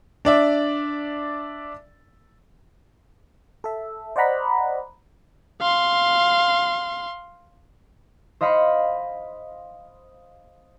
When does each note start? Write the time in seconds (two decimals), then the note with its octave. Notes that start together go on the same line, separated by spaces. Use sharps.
0.25 D4 D5 E5
3.64 A4 E5
4.16 C5 D5 D#5 F#5 A#5 B5
5.61 F5 C6
8.41 C5 D#5 F5 B5 C#7